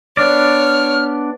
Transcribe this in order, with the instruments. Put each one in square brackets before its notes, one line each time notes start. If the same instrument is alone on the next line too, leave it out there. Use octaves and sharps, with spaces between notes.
[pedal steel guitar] B3 D4 D5 [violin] C#5 [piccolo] F6